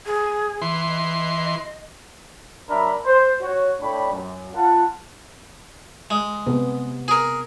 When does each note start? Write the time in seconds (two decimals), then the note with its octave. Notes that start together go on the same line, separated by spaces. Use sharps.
0.06 G#4
0.62 E3 C6
0.89 D#5
2.69 F#3 D4 A#4 E5 B5
3.05 C5
3.42 F#4 C#5
3.81 A2 D4 C#5 G5 B5
4.11 F#2
4.54 F4 F#5 A5
6.10 G#3
6.47 C3 B3
7.08 G#4 A#4